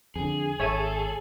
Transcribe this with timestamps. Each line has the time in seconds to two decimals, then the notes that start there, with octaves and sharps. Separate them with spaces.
0.16 F2 D3 G#4
0.60 G#1 A4 C#5 E5 D#7